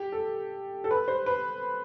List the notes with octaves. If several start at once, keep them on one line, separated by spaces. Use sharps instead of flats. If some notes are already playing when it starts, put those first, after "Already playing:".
Already playing: G4
A4
A4
B4
C5
B4